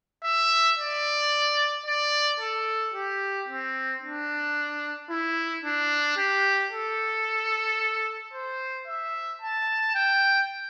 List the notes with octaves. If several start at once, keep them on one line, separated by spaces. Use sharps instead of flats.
E5
D5
D5
A4
G4
C4
D4
E4
D4
G4
A4
C5
E5
A5
G5